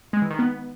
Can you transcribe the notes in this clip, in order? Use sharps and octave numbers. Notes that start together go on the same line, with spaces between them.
G#3
E3
D#3
B3